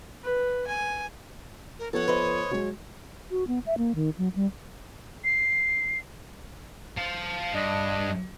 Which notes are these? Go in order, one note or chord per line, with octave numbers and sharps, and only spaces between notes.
B4
G#5
A#4
F3 B3 A4 C#5 F#5 A5
B4 C5 D#5
F#3 G#3
F#4
B3
E5
A#3
D#3
F#3
G3
C7
F5 A5
G2 D4 D#5